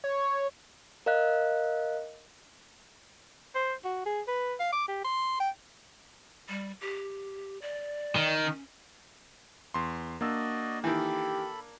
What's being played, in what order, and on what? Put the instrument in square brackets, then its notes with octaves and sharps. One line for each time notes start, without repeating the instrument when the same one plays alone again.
[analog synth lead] C#5
[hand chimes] A#4 D#5 F5 F#6
[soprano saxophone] C5
F#4
G#4
B4
F5
D6
G4
C6
G5
[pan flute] G3
G4
D5
[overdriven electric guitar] D#3
[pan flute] C#4
[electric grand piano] E2 C6
[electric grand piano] A#3 D4 E6 [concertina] F#4 D5 D#5
[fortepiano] D#3 E3 [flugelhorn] G4 [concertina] A4 B5